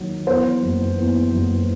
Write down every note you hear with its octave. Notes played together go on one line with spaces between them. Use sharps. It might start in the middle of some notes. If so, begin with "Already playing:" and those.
Already playing: D#2 D#3 F#3
E2 C5
F#1
E2
F#1